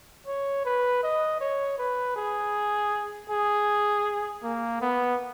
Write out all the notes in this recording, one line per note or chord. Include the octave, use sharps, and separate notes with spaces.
C#5
B4
D#5
C#5
B4
G#4
G#4
A#3
B3